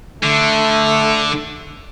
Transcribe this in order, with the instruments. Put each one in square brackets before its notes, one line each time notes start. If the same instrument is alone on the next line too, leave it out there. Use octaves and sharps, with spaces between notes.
[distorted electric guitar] D3 [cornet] A3